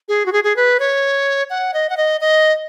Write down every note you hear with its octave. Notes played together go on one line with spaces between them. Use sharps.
G#4
F#4
G#4
G#4
B4
C#5
F#5
D#5
F#5
D#5
D#5